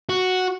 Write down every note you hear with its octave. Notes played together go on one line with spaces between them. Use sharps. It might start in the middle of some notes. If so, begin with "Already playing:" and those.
F#4